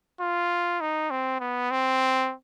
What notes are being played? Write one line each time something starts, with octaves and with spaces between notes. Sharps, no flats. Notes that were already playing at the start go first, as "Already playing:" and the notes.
F4
D#4
C4
B3
C4